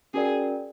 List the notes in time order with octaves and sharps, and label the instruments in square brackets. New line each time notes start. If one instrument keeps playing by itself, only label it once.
[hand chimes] C#4 F#4 A#4 D5 G5 [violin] G#4